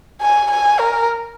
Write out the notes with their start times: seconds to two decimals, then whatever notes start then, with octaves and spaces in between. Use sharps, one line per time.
0.21 G#5
0.51 G#5
0.80 A#4